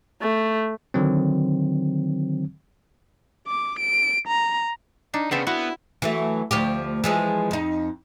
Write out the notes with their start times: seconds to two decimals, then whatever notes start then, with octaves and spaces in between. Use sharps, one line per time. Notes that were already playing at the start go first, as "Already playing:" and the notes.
0.21 A3
0.94 D3 D#3 F#3 C4
3.47 D6
3.79 D7
4.27 A#5
5.14 D4 D#4
5.31 C#3 B3 C4 A4 E5
5.47 B3 E4 F#4
6.02 E3 F#3 A3
6.51 D2 F3 G4
7.04 E3 F3 G#3
7.51 F2 D#4